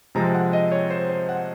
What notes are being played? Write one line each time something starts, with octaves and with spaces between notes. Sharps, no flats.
C3 F3 G#3 C4 A#5
F#5
D#5
C#5
C5
C5
F#5